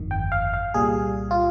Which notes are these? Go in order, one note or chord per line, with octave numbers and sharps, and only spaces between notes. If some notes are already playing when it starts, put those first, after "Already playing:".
Already playing: G1 F2 D#3
G5
F5
F5
C2 A#2 G3 G#4
F4